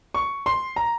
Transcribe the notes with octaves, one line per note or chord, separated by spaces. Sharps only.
C#6
C6
A#5